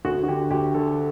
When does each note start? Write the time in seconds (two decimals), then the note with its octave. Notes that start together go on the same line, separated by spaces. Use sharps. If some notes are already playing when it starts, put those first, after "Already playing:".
0.05 D2 F#4
0.23 F#4
0.28 D3 G4
0.51 D2 G4
0.74 D3 A4